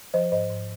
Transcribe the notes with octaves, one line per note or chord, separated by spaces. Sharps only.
F3 C5 D#5
G#2 C5 D#5
G#2